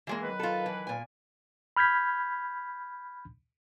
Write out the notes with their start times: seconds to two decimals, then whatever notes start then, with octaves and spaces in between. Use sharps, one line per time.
0.07 E3 G#3 A#3
0.22 D#3 F#3 B4
0.39 F4 A4
0.66 E3
0.87 A#2 G#5
1.76 B5 F6 G6 G#6 B6